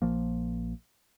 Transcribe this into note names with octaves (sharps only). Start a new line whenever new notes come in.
A#1 F3 A#3